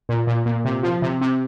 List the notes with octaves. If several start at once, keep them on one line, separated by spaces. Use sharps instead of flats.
A#2
A#2
A#2
C3
F3
C3
C3